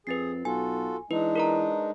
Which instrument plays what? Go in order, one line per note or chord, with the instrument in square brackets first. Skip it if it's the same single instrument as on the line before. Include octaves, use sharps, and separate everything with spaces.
[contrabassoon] F2 [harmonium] G#4 [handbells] B4 A6 C7
[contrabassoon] B1 [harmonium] F4 F#4 A4 [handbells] G#5
[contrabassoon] E3 [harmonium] G#3 D4 D#4 [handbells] B4
[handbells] A#4 B4 A#5